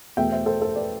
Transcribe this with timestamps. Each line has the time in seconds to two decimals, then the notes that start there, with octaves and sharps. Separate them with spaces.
0.17 E2 B2 A3 E5 G5
0.32 C5 E5
0.46 A4 C5
0.61 A4 C5
0.75 B4 D5